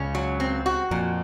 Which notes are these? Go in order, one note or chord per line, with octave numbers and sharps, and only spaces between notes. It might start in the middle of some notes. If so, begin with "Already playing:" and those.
Already playing: C#2 C#3 C#4
F#3
C4
F#4
F2 A#2 F3